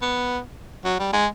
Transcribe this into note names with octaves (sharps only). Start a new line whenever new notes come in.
B3
F#3
G3
G#3